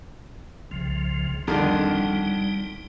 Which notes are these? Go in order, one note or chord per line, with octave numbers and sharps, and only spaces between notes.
C2 C#3 F3
F2 D3 D#3 G3 D#4